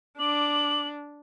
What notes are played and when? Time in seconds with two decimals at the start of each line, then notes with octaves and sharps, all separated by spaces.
0.19 D4 D6 F#7